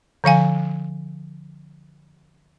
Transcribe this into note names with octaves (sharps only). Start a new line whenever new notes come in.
D3 F3 F5 G#5